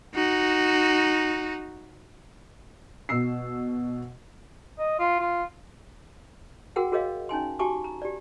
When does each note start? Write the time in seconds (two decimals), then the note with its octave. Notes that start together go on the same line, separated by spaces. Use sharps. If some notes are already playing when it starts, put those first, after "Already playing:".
0.15 D#4 F#4
3.09 B2 E6 C7
4.79 D#5
4.99 F4
5.20 F4
6.76 F#4 G#4 A#4 F#5 G5
6.92 F#4 G#4 A#4 C#5 D#5 F5
7.29 C#4 D#4 G#5 C6
7.59 F#4 G4 G#5 A5 C#6 D6
7.84 A#5
8.02 G4 D5